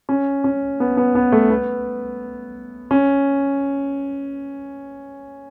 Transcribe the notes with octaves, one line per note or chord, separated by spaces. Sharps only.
C#4
C#4
B3
B3
B3
A3
B3
C#4